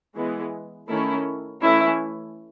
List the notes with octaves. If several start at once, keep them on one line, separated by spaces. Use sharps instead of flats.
E3 G#3 B3
D#3 A3 C#4 E4
E3 A3 C#4 E4